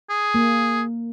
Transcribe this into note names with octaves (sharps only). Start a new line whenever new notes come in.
G#4
A#3